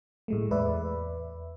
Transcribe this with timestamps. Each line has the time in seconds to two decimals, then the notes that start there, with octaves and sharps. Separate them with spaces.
0.28 A2 G#3 A3
0.51 E2 B4 D5 E5